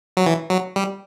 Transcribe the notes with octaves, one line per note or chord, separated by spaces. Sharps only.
F#3
E3
F#3
G3